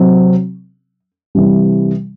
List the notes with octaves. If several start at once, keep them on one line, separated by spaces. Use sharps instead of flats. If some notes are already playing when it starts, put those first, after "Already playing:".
Already playing: C3 F#3 C4
C3 E3 G3